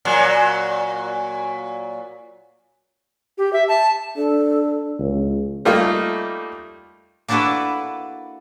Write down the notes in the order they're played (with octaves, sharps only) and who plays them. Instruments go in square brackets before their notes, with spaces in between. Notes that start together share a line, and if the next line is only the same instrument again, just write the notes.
[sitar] A#2 F#3
[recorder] G4
E5
A5
[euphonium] D4 [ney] A4
[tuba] C#2
[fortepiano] G3 A3 A#3 D#4 F4
[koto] A#3 D4 E4 F#4 A4 B4